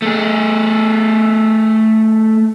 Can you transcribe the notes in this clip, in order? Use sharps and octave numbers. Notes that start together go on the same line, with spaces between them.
A3 G#4